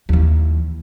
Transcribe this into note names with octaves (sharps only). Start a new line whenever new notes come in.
D#2 E3